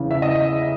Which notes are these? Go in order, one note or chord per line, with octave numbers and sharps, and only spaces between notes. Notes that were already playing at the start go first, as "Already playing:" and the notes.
Already playing: E2 C#3 E3
E5
D#5